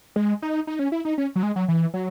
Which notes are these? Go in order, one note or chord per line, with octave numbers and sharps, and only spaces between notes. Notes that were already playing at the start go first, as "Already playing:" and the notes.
G#3
D#4
D#4
C#4
E4
D#4
C#4
F#3
G#3
F#3
E3
F#3